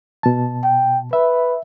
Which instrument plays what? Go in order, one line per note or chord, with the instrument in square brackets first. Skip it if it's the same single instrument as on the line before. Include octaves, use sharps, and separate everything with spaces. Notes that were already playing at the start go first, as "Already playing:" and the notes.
[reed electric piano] B2 A5
[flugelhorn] G5
[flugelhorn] B4 [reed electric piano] E5